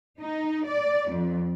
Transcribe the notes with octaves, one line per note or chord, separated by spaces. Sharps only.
D#4
D5
F2